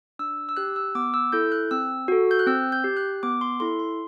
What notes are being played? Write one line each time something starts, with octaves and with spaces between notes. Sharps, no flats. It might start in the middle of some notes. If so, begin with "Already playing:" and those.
D4 E6
E6
G4 F#6
E6
B3 D6
E6
E4 A4 G6
F#6
C4 E6
F#4 A4
G6
F#6
C4 E6
G6
G4
F#6
B3 D6
C6
E4 A4 C6
C6